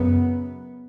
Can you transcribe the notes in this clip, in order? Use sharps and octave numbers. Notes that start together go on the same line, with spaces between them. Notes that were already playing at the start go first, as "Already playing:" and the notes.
Already playing: F#2 C#3 B3